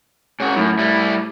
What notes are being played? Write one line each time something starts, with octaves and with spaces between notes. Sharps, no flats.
G#2 C#4 F#4
F#2 A2
G3 E4